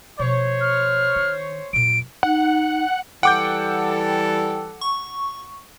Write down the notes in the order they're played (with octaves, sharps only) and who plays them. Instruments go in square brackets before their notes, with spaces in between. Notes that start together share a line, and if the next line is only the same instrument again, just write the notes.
[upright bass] B2 F3 [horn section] C5 C#5
[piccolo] F6
[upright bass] D#3
[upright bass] F#2 A#2 [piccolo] D7
[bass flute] D#4 [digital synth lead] F#5
[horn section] E3 G3 A4 [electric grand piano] F#5 D6 G6 [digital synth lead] G5
[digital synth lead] C#6